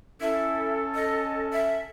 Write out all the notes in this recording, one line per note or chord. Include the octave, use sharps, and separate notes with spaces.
C#4 E4 A4
D#5
E5